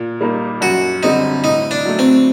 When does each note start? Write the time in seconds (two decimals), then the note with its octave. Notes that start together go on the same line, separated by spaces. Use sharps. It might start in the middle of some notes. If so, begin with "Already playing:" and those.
Already playing: A#2
0.21 G3 A#3 D#4
0.61 F#2 F#4
1.03 D3 G3 C4 D#4
1.44 A2 D#4
1.71 D4
1.85 F#3 A3
1.99 C4